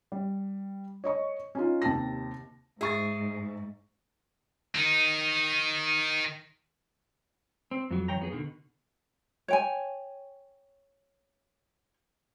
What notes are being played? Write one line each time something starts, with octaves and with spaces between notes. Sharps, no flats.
G3
C#5 D#5 C#6
C#4 D#4 F4
D#2 C3 A5 A#6
G#2 G#4 E5 C#6 A6
D#3 D#4
C4
F2 F#3
F#2 E3 C#5 G5 A#5
F2 B3 G#4
B2 D3 D#3
C#5 G5 G#5